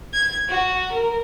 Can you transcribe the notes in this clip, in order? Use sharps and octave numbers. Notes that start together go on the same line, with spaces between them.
G#6
F#4
A#4